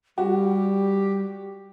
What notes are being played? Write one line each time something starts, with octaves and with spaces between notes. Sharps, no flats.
G3 F#4 G4